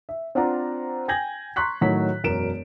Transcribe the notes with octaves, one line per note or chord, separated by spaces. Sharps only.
E5
C4 D4 F4 D5 F#5 A#5
G5 G#5 G6 G#6 A#6 F#7
A#5 C6 C#6 F#6 B6
A2 D#3 F#3 B6
E1 F#2 A#4 D7 E7